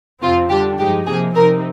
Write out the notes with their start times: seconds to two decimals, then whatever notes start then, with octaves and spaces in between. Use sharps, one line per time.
0.22 F2 C3 F3 C4 F4
0.49 D3 G3 D4 G4
0.78 G2 F3 G#3 D#4 G4
1.06 C3 F3 A#3 D#4 G#4
1.34 C3 F3 C4 D#4 A#4